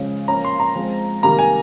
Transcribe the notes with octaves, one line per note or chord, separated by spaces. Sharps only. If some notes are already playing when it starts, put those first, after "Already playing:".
Already playing: C#3 F3 G#3 C#4
F3 A#3 C#4 A#5
C6
A#5
F3 G#3 C4
C3 D#3 G3 A#3 A#5
G#5